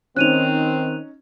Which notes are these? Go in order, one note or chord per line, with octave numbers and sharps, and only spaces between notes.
D#3 C4 C#4 D#4 F#6 D#7 F7